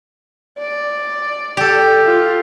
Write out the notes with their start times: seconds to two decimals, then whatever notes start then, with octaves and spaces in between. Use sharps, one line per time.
0.59 D5
1.57 G4 A4
2.06 F4